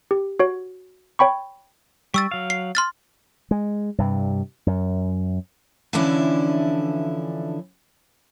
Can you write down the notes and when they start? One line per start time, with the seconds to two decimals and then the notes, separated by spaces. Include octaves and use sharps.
0.11 G4
0.40 F#4 C#5
1.19 C#5 G5 B5 C#6
2.14 G3 C#6 E6 A6
2.31 F#3 F5
2.50 C7
2.75 C6 F6 A6
3.51 G#3
3.98 G2 C3
4.67 F#2
5.93 D3 E3 F3 C#4 D4 E4